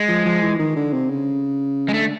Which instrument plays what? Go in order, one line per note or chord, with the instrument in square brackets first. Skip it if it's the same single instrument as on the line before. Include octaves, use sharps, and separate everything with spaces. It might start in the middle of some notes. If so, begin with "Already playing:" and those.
Already playing: [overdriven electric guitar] G#3
[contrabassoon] F3
F3
E3
D#3
D3
C3
C#3
[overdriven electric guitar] G#3
[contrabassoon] D3 [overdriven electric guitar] A3